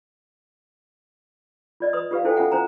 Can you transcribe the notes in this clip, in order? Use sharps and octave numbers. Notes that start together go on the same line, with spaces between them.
F4 D5 D#5
B4 C6 D#6
F4 G4 B4 F5
E4 F#4 A4 C5 G5 G#5
C#4 F4 A4 E5 F#5 G#5
C#4 C5 G#5 A#5